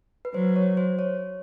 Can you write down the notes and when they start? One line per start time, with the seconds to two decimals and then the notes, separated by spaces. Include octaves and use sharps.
0.25 B4
0.34 F#3 C5
0.56 C#5
0.77 C5
0.99 C#5